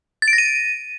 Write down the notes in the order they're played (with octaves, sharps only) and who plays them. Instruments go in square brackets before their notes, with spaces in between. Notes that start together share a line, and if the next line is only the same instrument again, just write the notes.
[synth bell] A6
D7
A#6
D#7